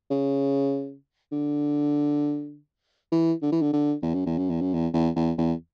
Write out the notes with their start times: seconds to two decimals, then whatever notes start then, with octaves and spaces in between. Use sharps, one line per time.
0.11 C#3
1.32 D3
3.12 E3
3.42 D3
3.52 E3
3.62 D3
3.73 D3
4.02 E2
4.14 F#2
4.26 E2
4.38 F#2
4.50 E2
4.61 F#2
4.74 E2
4.94 E2
5.16 E2
5.38 E2